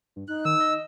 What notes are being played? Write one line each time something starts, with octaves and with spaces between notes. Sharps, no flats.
G2
D#4 F#6
D#3 E6
D#5